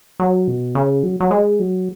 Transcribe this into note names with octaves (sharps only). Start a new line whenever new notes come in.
F#3
B2
C#3
F#3
F#3
G#3
F#3